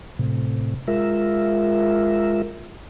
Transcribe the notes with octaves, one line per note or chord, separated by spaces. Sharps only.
A2 C3
G#3 F4 A#4 E5